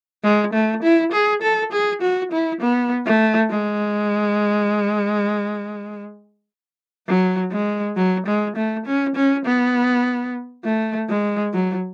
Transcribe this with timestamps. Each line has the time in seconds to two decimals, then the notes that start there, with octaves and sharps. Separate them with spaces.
0.24 G#3
0.53 A3
0.83 E4
1.12 G#4
1.42 A4
1.72 G#4
2.02 F#4
2.32 E4
2.61 B3
3.06 A3
3.51 G#3
7.07 F#3
7.52 G#3
7.96 F#3
8.27 G#3
8.56 A3
8.86 C#4
9.16 C#4
9.46 B3
10.65 A3
11.09 G#3
11.54 F#3